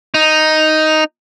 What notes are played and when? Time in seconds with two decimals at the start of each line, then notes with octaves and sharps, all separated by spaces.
0.14 D#4